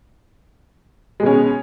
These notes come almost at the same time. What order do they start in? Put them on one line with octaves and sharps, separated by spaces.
G#3 B2 C#4